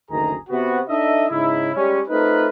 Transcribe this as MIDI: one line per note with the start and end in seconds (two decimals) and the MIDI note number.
0.10 0.34 30
0.10 0.34 38
0.10 0.34 51
0.10 0.34 68
0.10 0.34 82
0.49 0.80 48
0.49 0.80 59
0.49 0.80 66
0.88 1.25 62
0.88 1.25 63
0.88 1.25 69
0.88 1.25 75
0.88 1.25 76
1.29 1.70 44
1.29 1.70 49
1.29 1.70 63
1.29 1.70 64
1.74 2.01 55
1.74 2.01 56
1.74 2.01 61
2.08 2.48 57
2.08 2.48 60
2.08 2.48 63
2.08 2.48 65
2.08 2.48 70
2.08 2.48 71